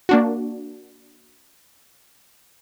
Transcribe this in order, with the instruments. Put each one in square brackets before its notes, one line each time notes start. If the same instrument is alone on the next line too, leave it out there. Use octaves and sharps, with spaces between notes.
[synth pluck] A#3 D4 F#4